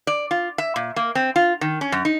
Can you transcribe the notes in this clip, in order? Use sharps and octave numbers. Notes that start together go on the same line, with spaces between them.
D5
F4
E5
A#2
A#3
C4
F4
D#3
C#4
F#2
D#4